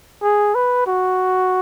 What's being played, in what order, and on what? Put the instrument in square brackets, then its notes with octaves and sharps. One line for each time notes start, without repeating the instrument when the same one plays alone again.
[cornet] G#4
B4
F#4